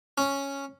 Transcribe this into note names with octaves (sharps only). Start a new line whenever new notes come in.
C#4